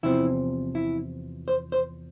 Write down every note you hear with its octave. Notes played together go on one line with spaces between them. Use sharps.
E2 C3 F3 C4 E4
E4
C5
C5